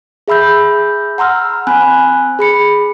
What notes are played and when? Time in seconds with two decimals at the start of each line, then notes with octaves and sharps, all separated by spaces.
0.28 G#4 E5 B5 E6 G6
1.18 F#5 A#5 C6 E6 F6
1.67 C4 G#5 B5 F#6
2.39 G#4 B5 C#7